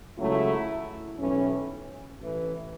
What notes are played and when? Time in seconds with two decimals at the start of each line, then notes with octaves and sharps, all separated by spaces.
0.17 C#2 C#3 F#3 A3 E4
1.18 B1 A2 E3 C#4
2.19 A1 A2 E3